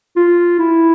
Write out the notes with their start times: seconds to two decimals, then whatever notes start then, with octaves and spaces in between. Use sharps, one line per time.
0.16 F4
0.59 E4